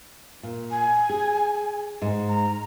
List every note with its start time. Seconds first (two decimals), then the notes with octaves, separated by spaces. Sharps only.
0.43 A#2
0.71 G#5
1.10 G#4
2.02 G#2 G#3
2.29 A#5